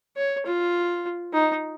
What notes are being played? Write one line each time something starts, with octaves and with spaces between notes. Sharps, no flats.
C#5
F4
D#4